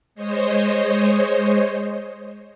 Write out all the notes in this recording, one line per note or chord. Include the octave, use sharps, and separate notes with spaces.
G#3 C5 C#5 D#5